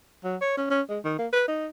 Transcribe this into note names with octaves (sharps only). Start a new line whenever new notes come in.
F#3
C#5
C#4
C#4
G#3
D#3
A#3
B4
D#4